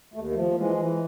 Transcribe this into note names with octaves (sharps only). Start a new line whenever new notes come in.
D#2 A3
F3 A3
E3 G#3
E3